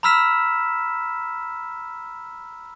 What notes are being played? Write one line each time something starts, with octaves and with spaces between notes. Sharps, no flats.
A#5 B5 E6 F6 B6 E7